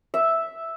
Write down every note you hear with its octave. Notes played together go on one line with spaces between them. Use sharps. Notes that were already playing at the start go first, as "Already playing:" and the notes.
E5